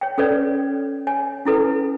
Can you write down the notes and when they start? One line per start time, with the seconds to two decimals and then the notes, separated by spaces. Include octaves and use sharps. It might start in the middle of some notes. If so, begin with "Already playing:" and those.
0.01 C#5 G5
0.18 C#4 A4 B4 C#5 D5
1.07 C#5 G#5
1.45 C#4 E4 A4 B4